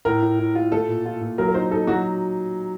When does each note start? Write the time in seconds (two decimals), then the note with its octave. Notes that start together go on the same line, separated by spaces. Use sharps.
0.05 A2 A#4
0.22 A2
0.39 A2
0.55 F4
0.72 A3 A4
0.88 A#2
1.05 F4
1.21 A#2
1.38 F#3 A#4
1.48 A#4
1.54 D#4 C5
1.71 D#4 A4
1.87 F#3 F#4